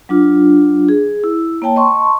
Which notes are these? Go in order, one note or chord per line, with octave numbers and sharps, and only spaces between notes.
F#3 D4 F4
G#4
E4
A#3 C#5 G5 A5
D#5 A5 C6 C#6